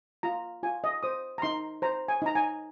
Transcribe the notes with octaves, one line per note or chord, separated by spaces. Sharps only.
F4 A#5
F4 G#5
D#5
C5 D#6
A#5
D#4 C6
C5 A#5
G#5
D#4 A#5
G#5